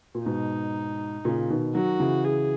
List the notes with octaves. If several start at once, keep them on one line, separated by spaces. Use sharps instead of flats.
A#2
G#2 B2 D#4
A#2 C#3
B2 D#3
D#3 F#3 F#4
C#3 E3
G#4